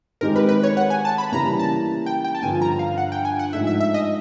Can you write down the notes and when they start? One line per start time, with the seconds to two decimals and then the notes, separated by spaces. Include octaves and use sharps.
0.21 D#3 G#3 C4 D#4 G4 A#4
0.36 B4
0.49 B4
0.63 C#5
0.77 F#5
0.90 G#5
1.05 A5
1.18 B5
1.32 C#3 E3 G3 A#3 A#5
1.59 A5
2.06 G5
2.24 G5
2.35 A5
2.42 G2 D3 F3 G#5
2.62 A#5
2.79 F5
2.98 F#5
3.12 G5
3.25 G#5
3.39 F#5
3.53 G#2 F3 A3 E5
3.67 E5
3.80 E5
3.94 D#5